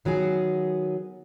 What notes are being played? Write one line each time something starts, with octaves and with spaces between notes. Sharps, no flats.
D#3 F#3 B3 G#4